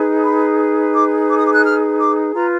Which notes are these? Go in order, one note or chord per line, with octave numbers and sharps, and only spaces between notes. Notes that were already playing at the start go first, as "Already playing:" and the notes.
Already playing: D#4 G#4 B4
B5
D6
D6
D#6
D6
F#6
F6
D6
F4 B4 A#5